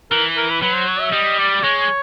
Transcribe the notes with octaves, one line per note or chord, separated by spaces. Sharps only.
E3 A#4
A#4
B4
F#3 B4
C5
C#5
E5
G3 D#5
D5
G#3 C#5